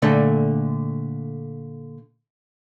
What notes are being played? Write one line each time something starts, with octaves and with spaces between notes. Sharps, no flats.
A#2 D3 A3